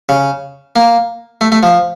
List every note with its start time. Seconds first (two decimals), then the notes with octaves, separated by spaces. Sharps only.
0.09 C#3
0.76 A#3
1.41 A3
1.52 A3
1.63 F3